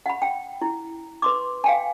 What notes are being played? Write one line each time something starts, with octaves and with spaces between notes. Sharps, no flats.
F#5 B5
G5
E4
B4 C6 D6
F5 G5 G#5